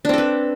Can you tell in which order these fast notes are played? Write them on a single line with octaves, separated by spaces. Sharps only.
D4 C4 A4 B4